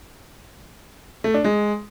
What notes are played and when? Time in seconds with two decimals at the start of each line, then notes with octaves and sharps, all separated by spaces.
1.24 A3
1.34 D4
1.44 G#3